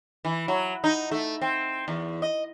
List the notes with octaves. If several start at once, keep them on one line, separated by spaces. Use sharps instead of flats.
E3
F#3
D#4
A3
C4
E2
D#5